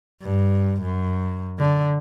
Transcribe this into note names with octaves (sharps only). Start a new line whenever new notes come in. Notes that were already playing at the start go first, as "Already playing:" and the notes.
G2
F#2
D3